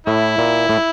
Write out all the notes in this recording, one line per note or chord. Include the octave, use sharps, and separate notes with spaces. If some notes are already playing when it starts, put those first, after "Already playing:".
A2 E4
A#2
A2